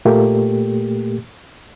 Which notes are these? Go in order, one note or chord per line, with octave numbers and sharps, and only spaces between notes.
A#2 A3 A#3 G4